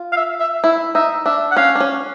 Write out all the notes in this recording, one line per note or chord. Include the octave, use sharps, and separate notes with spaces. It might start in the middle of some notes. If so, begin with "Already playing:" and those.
Already playing: F4
F5
E5
E5
E4 E5
D#4 E5
D4 E5
F#5
C#4 F5
D4
C#4